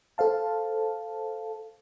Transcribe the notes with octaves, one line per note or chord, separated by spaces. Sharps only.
A4 C5 F5 A5